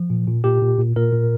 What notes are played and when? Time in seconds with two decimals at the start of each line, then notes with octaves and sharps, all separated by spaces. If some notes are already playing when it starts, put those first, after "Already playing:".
Already playing: F3
0.10 A#2
0.27 A#2
0.44 A#2 G4
0.62 A#2
0.78 A#2
0.96 A#2 A#4
1.13 A#2